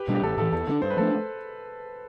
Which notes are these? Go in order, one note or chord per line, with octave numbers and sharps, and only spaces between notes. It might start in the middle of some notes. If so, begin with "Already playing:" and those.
Already playing: G4 B4
B2 G3 D4
G4
A1 A4
A2 E3 A4
E2 A4
D3 A3 D4
G2 C5
B4
F3 A3 D4 A4 C5